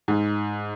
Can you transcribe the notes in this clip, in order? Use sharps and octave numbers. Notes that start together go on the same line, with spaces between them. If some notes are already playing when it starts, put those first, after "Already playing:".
G#2